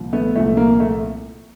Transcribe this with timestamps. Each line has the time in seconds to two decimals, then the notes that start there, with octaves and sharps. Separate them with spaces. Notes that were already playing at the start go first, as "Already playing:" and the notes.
Already playing: C2 A#2 F3
0.13 A3 B3
0.35 C2 A#2 F3 A3
0.57 A#3
0.80 A3